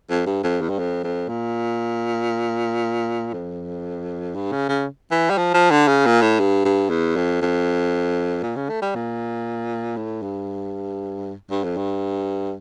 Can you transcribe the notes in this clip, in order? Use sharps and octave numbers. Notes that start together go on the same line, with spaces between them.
F2
G2
F2
E2
G2
F2
F2
A#2
F2
G2
C#3
C#3
E3
G3
F3
F3
D3
C#3
A#2
A2
G2
G2
E2
F2
F2
A#2
C#3
A3
G3
A#2
A2
G2
G2
F2
G2